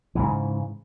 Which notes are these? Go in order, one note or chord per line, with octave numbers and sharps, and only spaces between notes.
G#2 C#3 E3